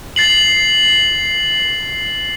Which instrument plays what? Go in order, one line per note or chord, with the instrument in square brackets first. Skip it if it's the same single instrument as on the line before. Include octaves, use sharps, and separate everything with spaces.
[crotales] A6 C7 F#7